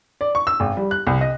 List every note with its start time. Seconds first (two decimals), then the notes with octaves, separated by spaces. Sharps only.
0.21 D5
0.35 C#6
0.47 E6
0.60 G#1
0.77 G3
0.91 F#6
1.07 C2
1.21 D#5